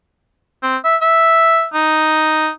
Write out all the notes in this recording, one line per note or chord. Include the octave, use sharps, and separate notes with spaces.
C4
E5
E5
D#4